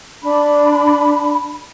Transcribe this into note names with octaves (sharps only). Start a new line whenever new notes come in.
D4 B5